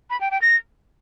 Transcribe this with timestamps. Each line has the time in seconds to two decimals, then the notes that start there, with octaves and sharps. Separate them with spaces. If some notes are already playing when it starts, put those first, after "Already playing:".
0.10 B5
0.21 G5
0.31 G5
0.42 A#6